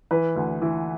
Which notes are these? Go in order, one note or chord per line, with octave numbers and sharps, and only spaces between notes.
E3 B4
D2
E3